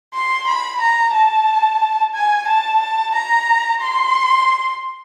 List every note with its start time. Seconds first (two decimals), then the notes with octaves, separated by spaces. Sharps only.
0.14 C6
0.47 B5
0.81 A#5
1.14 A5
2.14 G#5
2.47 A5
2.81 A5
3.14 A#5
3.81 C6